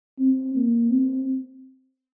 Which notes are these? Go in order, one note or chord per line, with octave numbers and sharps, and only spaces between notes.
C4
A#3
C4